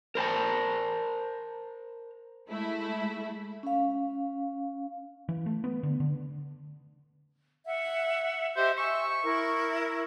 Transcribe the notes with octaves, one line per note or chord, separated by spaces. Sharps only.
A#4 C5 G#5 A5
G#3 A3 E4
C#4 F5
E3
A3
B3
D3
D3
E5 F#5
G4 C5 D#5 E5
E5 G#5 C#6 E6
E4 A#4